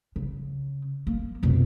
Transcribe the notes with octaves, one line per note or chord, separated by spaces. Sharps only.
C#3
A#3
F1 B2